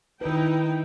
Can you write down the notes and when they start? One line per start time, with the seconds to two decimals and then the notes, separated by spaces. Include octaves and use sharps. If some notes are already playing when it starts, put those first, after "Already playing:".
0.21 D#3 D#4 E4 B4 G5